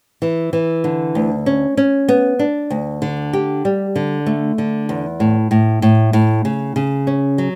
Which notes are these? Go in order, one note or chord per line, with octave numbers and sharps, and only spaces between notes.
E3
E3
D3
D2
C#4
C#4
B3
D4
D2
D3
G4
G3
D3
A3
D3
E2
A2
A2
A2
A2
C#3
C#3
C#4
F#3